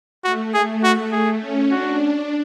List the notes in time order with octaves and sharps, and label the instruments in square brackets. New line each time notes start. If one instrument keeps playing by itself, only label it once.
[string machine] A3 [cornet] F#4
[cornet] G#4
F#4
G#4
[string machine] C#4
[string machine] D4 [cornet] F#4